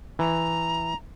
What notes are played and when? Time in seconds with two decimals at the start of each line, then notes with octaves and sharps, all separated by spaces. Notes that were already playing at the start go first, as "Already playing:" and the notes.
0.19 E3 A#5